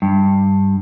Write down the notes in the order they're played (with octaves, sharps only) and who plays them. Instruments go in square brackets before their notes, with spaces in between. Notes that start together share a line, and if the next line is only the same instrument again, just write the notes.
[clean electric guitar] G2